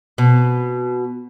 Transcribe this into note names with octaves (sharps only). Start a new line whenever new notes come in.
B2